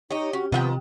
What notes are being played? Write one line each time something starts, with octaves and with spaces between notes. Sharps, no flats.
D#4 G4 C#5 D#5
C#4 F#4
C3 D#3 F3 B3 F#5 G5